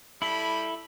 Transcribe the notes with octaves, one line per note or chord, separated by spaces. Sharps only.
G3 E4 A4 B5